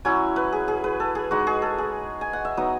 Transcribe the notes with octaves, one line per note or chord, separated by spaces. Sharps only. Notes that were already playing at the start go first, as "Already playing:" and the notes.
F#3 C#4 E4 G#5
B4
G#4
G#4
B4
A4
G#4
G#3 D#4 F#4
G#4
A4
G#4
G#5
F#5
E5
F#3 B3 D#4 D#5